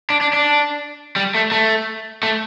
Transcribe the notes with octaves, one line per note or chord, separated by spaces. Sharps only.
D4
D4
D4
G3
A3
A3
A3